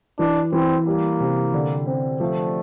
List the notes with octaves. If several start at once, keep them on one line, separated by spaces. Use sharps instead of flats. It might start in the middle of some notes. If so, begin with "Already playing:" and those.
E3 D4
E3 C4
G3 A#3
C3
D3
C4
F3 A3